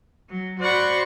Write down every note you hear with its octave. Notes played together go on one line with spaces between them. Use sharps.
F#3
F#4 C5 D5 F#5 B5 C#6